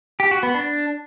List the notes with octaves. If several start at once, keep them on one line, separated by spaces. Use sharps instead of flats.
G4
F#4
B3
D4